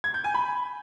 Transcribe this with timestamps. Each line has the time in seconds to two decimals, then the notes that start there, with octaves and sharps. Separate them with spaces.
0.04 G#6
0.14 G6
0.24 G#5
0.34 B5